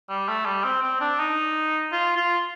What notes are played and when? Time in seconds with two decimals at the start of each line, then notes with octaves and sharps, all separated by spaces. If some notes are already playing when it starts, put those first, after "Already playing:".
0.09 G3
0.28 A3
0.46 G3
0.64 C4
0.82 C4
1.01 D4
1.20 D#4
1.92 F4
2.17 F4